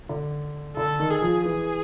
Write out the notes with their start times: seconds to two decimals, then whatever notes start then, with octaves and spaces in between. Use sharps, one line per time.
0.09 D3
0.77 D3 A4
0.99 D#3
1.11 G#4
1.22 F3
1.45 E3 G#4